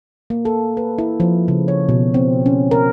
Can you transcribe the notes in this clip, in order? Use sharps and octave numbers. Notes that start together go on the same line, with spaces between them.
A#3
A4
B4
E4
F3
C#3
C#5
B2
C4
C#4
A#4